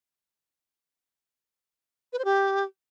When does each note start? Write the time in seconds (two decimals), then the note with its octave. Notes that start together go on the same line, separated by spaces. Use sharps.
2.13 B4
2.19 C5
2.25 G4